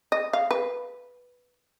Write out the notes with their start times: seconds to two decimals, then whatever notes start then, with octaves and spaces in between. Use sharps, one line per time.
0.12 D#5
0.33 F5
0.51 B4